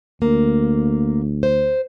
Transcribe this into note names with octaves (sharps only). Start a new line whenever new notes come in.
D2 A#3
C5